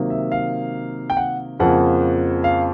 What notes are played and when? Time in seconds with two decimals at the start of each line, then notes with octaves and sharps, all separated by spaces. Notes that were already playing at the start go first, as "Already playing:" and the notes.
Already playing: C3 D#3 F#3 A#3
0.10 E5
0.32 F5
1.10 G5
1.17 F#5
1.60 F2 C#3 F3 A#3 F#5
2.44 F5